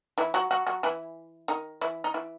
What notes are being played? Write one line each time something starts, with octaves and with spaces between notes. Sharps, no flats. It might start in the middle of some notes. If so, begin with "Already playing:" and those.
E3 E4
F#3 F#4
F#3 F#4
F#3 F#4
E3 E4
D#3 D#4
E3 E4
D#4
E3 E4